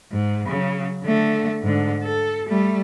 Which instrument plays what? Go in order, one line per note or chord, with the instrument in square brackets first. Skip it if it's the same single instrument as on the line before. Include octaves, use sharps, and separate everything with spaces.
[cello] G#2
C#3 F#3
D3 A3
G#2 D3
A4
G3 A3